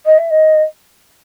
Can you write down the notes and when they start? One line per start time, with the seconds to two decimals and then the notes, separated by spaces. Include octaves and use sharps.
0.05 D#5
0.18 E5
0.30 D#5